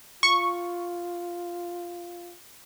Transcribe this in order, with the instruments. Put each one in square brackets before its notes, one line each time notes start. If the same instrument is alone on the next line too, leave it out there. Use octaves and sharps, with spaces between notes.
[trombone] F4 [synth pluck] C#6